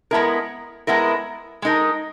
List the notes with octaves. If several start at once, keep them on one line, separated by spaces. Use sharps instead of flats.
G#3 B3 E4 A#4
G#3 B3 E4 A#4
G#3 D#4 A#4